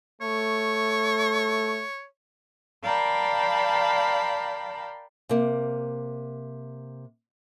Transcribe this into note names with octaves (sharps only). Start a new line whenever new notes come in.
A3 C#5
A#4 D5 F5 G5 A5 B5
C3 A#3